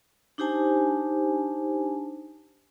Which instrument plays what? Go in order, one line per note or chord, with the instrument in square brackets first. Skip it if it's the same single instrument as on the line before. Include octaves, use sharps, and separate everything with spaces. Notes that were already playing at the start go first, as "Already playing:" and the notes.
[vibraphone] D4 D#4 G4 C5 G#5 A5